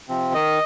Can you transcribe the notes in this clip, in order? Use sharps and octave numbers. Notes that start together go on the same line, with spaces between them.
C3 F3 C4
D#3 D#5